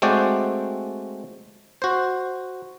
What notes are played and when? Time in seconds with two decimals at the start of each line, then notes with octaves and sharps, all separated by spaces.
0.02 G#3 A3 C4 F#4 D5 G5
1.82 F#4 C5